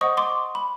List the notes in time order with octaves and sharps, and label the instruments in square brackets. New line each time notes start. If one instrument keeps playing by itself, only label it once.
[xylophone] C5 D#5 F#5 C#6 D#6
C6 D6
B5